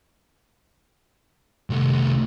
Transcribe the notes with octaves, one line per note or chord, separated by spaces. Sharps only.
C2 A3